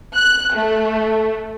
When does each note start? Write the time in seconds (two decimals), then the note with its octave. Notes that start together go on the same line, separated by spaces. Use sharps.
0.15 F#6
0.55 A3